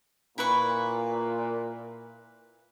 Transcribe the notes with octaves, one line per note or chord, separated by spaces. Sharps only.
A#2 E4 B4 C#6